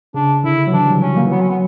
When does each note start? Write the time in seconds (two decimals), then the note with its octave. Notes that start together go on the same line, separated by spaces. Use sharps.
0.14 C#3 D4
0.44 D3 E4
0.67 F#3
0.73 E3 D4
0.87 G3
1.02 F#3 C#4
1.16 A#3
1.27 E3
1.31 F#3 B3
1.41 C#4
1.50 B3